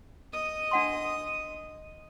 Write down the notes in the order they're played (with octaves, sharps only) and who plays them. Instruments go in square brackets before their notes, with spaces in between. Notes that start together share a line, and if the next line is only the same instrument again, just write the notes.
[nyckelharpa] D#5 D#6
[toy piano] D4 F#5 C6